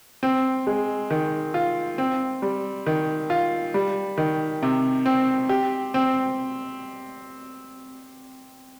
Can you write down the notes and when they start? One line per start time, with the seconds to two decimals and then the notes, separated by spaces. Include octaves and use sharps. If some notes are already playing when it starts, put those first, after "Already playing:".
0.23 C4
0.67 G#3
1.10 D#3
1.54 F4
1.98 C4
2.42 G3
2.86 D#3
3.30 F4
3.74 G3
4.17 D#3
4.63 C3
5.06 C4
5.49 G4
5.94 C4